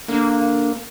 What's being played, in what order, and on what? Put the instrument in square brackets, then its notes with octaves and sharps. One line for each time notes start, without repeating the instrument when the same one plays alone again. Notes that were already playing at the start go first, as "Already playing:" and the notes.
[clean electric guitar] D3 [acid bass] A#3